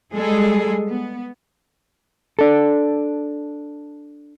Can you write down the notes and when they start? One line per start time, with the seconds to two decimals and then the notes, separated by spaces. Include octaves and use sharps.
0.13 G3 G#3 G#4 A4
0.89 B3
2.39 D4 A4